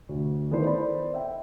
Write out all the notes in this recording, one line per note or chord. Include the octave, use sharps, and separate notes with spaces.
D2
D#3 B3 E4 A4 B4 C5
C5 D5 B5
E5 G5